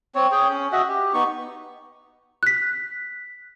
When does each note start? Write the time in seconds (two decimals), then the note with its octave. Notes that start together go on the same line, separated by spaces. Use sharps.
0.15 C4 C#5
0.32 G#4 C#5 G5
0.49 C#4
0.72 F#4 D#5 E5 F#5
0.88 G4
1.13 B3 D#4 C#6
2.43 F#6 B6